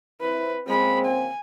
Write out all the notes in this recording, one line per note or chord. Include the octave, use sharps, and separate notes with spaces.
C4 E4 B4
C#3 G#3 A#3 C4 B5
G#5